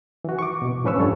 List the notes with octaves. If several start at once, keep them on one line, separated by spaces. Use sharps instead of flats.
E3 F#4
C#6 D6
B2
A2 F3 C#4 B4 C#6 E6
G2 A4 C#5